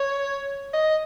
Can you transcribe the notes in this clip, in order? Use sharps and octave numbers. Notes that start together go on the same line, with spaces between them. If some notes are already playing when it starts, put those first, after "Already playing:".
Already playing: C#5
D#5